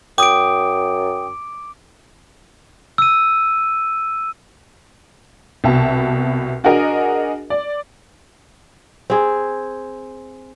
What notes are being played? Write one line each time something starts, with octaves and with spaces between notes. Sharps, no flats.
F#2 G5 D6 D#6 D7
E6 D#7
C2 B2 E5 A5
D4 F#4 G#4 A#4 D#5
D5
C4 G#4